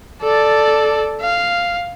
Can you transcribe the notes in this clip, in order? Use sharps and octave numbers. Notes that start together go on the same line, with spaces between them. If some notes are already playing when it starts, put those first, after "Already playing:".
A4 D5
F5